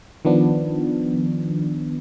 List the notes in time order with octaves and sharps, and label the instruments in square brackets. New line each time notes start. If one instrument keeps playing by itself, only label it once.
[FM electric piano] D#3 F3 B3 D4